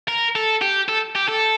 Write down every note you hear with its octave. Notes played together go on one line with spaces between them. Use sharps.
A#4
A4
G4
A4
G4
A4